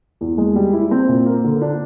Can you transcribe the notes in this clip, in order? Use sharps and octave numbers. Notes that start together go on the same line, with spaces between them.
E2
G#3
G3
E4
C4
A#2
A#3
D3
D4